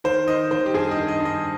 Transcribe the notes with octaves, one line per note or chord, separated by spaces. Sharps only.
D#3 C5
D#3 D#5
D#3 C5
G4
G2 G#4
D#5
D#3
D#5
G2
D#5